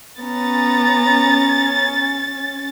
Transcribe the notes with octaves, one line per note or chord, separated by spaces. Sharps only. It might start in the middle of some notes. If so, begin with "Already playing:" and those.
B3 C#4 A#5 A6